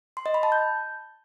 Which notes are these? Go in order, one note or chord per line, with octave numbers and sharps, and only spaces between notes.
C6
D#5
B5
A5
G6